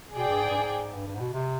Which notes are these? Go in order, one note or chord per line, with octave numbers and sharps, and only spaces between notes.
B2 G#4 D5 G5
G2
G#2
G2
G#2
G2
G2
G#2
B2
C3